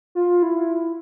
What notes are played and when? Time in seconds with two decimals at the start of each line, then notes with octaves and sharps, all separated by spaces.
0.15 F4
0.43 E4